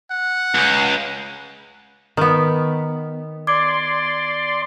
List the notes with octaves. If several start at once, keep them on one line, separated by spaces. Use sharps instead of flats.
F#5
C#2
D#3 B3
D5 C6 D6 G#6